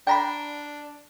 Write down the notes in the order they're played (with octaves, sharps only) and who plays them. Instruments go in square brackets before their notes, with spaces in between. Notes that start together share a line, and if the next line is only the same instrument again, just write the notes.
[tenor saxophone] D4 [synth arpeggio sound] G5 A#5 B5